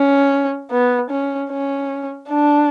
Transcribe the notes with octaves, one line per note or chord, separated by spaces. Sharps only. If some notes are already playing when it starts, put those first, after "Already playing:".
Already playing: C#4
B3
C#4
C#4
D4